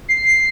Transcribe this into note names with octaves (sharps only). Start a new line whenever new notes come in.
C7